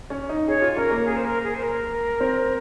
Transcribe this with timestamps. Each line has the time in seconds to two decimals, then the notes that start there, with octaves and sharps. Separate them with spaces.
0.10 C#4
0.29 D#4
0.48 G#4 C#5
0.62 F4
0.77 C#4 A#4
0.91 A#3
1.06 G#4
1.16 C5
1.25 A#4
1.44 G#4
1.55 C5
1.63 A#4
2.20 C4